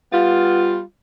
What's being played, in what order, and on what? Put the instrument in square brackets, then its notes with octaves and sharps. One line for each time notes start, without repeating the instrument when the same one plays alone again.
[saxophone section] G3 B3 F4